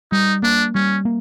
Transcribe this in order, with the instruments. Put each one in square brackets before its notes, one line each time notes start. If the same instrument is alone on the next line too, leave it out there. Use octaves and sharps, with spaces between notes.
[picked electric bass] G3 [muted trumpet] D#4
[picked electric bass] A#3 [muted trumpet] D4
[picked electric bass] G3 [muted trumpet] C#4
[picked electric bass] A#3